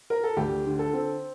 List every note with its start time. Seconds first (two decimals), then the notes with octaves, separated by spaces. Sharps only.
0.10 A#4
0.24 A4
0.37 D2 G4
0.66 D3
0.79 A4
0.93 C4